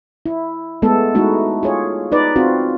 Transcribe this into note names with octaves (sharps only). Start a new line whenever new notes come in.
E4
G#3 A3 B3 A4
G#3 A3 D#4 E4 F#4
F4 G#4 C#5
D#4 B4 D5
C4 F4 F#4